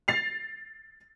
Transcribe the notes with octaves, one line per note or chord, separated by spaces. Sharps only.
A6 C7 F7